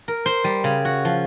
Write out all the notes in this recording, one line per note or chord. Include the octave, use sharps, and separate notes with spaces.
A#4
C5
G3
C#3
F#4
F3